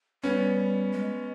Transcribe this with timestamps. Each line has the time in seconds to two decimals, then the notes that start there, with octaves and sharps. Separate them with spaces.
0.23 G3 B3 C#4
0.92 G#3